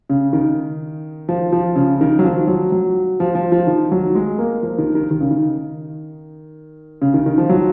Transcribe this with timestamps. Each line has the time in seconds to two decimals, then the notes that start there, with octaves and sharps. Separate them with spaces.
0.10 C#3
0.33 D#3
1.29 F3
1.53 F3
1.76 C#3
2.01 D#3
2.19 F#3
2.24 F3
2.47 F#3
2.72 F#3
3.20 F3
3.35 F3
3.52 F3
3.67 D#3
3.92 F#3
4.15 G#3
4.38 A#3
4.63 F3
4.78 D#3
4.95 D#3
5.11 D#3
5.21 C#3
5.31 D#3
7.02 C#3
7.14 D#3
7.26 D#3
7.38 F3
7.49 F#3